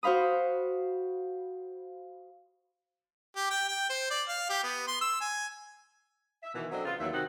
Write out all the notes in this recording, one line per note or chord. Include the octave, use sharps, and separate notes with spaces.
F#4 C5 F5 B5 D#6
G4
G5
G5
C5
D5
F5
G4
B3
C6
E6
G#5
E5
B2 D#3 E3
F#3 C4 D4 A4 D#5
C#3 B3 F4
D#2 E3 F#3 E5
C3 D#3 C4 D#4 F#4